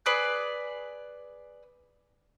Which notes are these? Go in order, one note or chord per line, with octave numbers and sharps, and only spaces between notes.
G#4 B4 D5 F#6